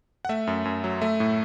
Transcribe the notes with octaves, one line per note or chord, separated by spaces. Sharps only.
F#5
A3 E5
F#2
F#2
F#3
A3 E5
A2